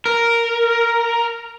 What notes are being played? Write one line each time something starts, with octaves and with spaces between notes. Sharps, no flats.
A#4